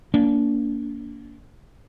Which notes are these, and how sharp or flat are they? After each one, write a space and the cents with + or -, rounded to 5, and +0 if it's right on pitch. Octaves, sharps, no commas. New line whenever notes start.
A#3 +0 D4 -35